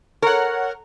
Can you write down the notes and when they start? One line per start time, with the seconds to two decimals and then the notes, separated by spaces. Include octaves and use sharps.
0.22 A#4 C#5 F#5